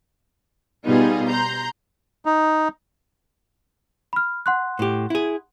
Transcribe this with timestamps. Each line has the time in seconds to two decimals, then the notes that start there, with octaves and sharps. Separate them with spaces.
0.86 B2 G3 B3 D#4 F4 G#4
1.29 A#5 C6 G6
2.26 D#4
4.13 B5 F6
4.46 F#5 C6 F#6
4.79 A2 G4
5.10 E4 G#4